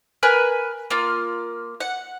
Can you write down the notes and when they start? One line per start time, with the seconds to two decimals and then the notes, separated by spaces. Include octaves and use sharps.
0.23 A#4 B4 G#5 F#6
0.90 A#3 F4 F6
1.80 F#5